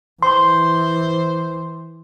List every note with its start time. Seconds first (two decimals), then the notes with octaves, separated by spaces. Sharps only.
0.23 E3 C5 C6